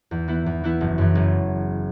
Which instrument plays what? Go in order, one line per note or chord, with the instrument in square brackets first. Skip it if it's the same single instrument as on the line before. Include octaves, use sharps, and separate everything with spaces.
[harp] E2
E3 B3 E4
E2
E3 B3 E4
F#1
F#2 E3
F#1